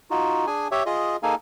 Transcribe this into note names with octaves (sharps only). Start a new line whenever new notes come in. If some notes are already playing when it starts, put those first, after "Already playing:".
D#4 F4 F#4
D4 G#4 G#5
G4 C#5 E5
F4 G#4 D#5
A#3 D#4 G#4 A4 F5 G#5